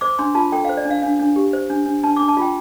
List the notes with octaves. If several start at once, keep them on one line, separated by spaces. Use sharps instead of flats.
C5 D6
D4 C6
F4 A5
A4 G5
C5 F5
D5
D4
F5
D4 F5
D4
G4
C5
D4
D4
D4 A5
D4 D6
A5
F4 G5